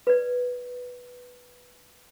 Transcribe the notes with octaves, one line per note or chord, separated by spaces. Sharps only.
B4 D5